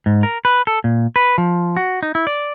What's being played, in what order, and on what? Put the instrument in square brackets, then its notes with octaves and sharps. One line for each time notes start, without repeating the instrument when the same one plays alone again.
[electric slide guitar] G#2
A#4
B4
A4
A#2
B4
F3
F#4
D#4
E4
D5